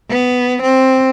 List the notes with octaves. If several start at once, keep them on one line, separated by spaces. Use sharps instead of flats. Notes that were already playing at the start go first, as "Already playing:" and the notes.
B3
C4